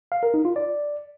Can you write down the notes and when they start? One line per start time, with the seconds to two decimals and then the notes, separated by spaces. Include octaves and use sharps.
0.12 F5
0.23 A#4
0.34 D#4
0.45 F4
0.56 D5